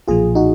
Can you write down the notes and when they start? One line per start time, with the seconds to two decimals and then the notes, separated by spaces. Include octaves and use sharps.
0.08 B1 A#2 F3 F4 G#4
0.35 D#4 F#4